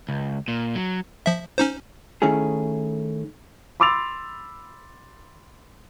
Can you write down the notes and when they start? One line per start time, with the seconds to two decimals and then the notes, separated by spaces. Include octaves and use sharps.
0.09 C#2
0.48 A#2
0.75 F#3
1.26 F3 E5
1.58 C#4 D#4 C5
2.22 D#3 A3 C#4 E4 G#4
3.80 B5 C6 D6 E6 A6 F7